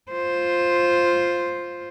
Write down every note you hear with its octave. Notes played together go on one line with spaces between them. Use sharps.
F4 C5